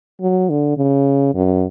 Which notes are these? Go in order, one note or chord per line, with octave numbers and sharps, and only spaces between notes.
F#3
D3
C#3
F#2